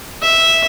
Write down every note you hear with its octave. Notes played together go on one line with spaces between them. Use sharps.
E5